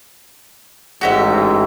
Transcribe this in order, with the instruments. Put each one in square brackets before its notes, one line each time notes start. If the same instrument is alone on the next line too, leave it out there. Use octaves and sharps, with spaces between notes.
[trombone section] A1 G#2 [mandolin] F#4 G4 E5